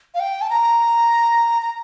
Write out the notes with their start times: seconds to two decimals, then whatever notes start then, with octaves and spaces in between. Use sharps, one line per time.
0.14 F5
0.20 G5
0.41 A5
0.50 A#5
1.62 A#5